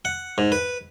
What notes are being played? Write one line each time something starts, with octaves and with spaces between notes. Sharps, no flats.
F#5
G#2
B4